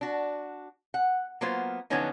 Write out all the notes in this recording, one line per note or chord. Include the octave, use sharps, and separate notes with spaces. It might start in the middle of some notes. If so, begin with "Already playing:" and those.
D4 F#4
F#5
F#3 A#3 B3 F4 C5
D3 F3 F#3 B3 C#4 D#4